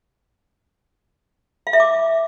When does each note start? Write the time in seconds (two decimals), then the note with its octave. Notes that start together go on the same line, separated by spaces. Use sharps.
1.67 F5
1.73 E5
1.80 D6